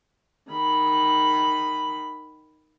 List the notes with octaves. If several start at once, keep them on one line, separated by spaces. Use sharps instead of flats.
D#3 B5